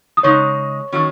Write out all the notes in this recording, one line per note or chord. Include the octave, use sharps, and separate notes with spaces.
D#6
C#3 G#3 D#4 C#5 C#6
D#3 F#3 C#4